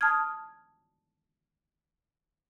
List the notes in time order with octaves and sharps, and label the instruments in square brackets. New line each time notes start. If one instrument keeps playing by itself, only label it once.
[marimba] A5 D#6 F6 G#6